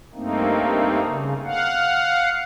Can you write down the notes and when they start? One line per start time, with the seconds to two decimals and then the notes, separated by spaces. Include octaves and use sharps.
0.14 G2 A3 A#3 C4 D#4
1.07 C#3
1.45 F5 F#5